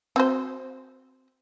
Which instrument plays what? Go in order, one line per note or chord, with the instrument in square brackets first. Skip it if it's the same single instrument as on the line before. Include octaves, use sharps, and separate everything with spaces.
[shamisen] C4 F#4 C5